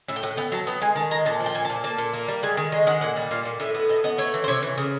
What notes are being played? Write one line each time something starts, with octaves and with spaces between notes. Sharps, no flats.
A2 E5
G5
A2 F#5
B3 G5
F#3 A5
B3 G5
G#3 G#5
D#3 A5
G#3 A#5
A#2 A5
F3
G5
A#2 G#5
A5
A#2
A#3 A5
A#2
A#3
G3
G#3 G#5
D#3
G#3
D#3 F#5
A#2 F#5
G3
A#2 F5
A#2
A2 E5
B3
A2 D#5
B3 D#5
A3 C#5
E3
C5
C3 C#5
E3
C#3